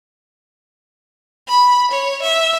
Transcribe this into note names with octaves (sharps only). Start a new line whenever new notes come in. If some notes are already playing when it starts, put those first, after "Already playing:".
B5
C#5
E5